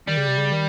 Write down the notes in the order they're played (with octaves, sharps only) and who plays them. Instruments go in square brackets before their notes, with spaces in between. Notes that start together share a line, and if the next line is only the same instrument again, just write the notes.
[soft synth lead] D#3 [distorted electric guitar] G3
[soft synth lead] C#3
C3
C#3
D#3